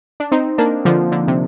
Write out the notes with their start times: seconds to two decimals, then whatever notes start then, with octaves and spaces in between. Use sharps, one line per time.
0.20 D4
0.32 C4 D#4
0.58 A#3 D4
0.85 D3 F3
1.12 D3
1.28 C3